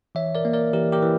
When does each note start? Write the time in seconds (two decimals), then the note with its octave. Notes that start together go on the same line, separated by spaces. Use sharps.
0.15 E3 C#5 E5
0.35 A#4 D5
0.45 A#3
0.53 A#4 D5
0.73 E3 G4 A#4
0.92 G4 A#4
1.02 E3